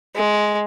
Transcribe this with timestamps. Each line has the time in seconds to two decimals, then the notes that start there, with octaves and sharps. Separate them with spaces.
0.15 G#3